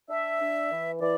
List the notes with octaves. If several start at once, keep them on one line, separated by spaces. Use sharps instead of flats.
D4 E5
D4
E3
E3 D5